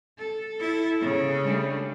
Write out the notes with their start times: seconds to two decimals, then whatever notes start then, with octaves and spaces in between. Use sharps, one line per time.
0.18 A4
0.59 E4
1.01 C#3
1.42 G3 A3 D4